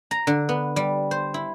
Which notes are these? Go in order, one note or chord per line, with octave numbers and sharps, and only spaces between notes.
A#5
D3
B3
G3
C5
E4